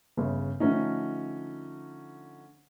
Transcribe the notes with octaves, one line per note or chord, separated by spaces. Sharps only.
G1 C#3
D3 F3 A3 C#4 D#4